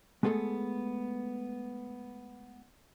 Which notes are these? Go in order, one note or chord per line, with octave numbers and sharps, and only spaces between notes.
G#3 A3 B3 G#4 A4